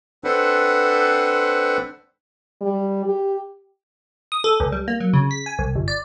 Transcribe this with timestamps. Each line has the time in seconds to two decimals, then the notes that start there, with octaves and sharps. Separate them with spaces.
0.24 C4 D4 A4 B4 C5 F#5
2.62 G3
3.06 G4
4.32 D#6
4.44 A4
4.60 C#2
4.72 G3
4.88 A#3
5.00 F#3
5.13 C#3
5.31 B6
5.46 G#5
5.59 C2
5.75 G1
5.88 D5